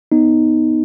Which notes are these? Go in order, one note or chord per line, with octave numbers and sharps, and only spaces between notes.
B3 D#4